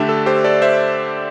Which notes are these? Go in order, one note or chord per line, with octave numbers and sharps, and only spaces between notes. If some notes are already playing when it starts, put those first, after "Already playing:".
Already playing: D3 A3 D4 G4 E5 A5
A4
G4 C5
A4 D5
C5 E5